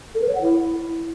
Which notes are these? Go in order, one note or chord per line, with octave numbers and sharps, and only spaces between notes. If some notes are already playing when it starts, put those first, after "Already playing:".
A4
B4
C#5
F#5
E4